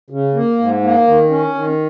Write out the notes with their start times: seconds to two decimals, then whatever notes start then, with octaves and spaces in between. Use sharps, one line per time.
0.10 C#3
0.34 A#3
0.59 G#2
0.83 A#3
1.07 D#3
1.30 C#4
1.55 D#3